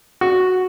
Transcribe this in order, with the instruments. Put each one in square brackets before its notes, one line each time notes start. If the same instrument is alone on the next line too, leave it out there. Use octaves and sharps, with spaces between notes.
[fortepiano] F#4